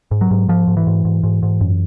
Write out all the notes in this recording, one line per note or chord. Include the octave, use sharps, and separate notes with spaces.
G#2
F#3
G#2
G#2 F3
G#2
E3
G#2
G#2
G#2
G#2
F#2